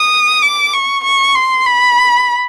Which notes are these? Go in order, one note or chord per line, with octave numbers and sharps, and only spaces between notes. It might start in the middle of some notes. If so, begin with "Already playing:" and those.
Already playing: D#6
D6
C#6
C#6
C6
B5